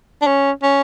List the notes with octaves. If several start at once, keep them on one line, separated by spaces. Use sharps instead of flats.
D4
C#4
C#4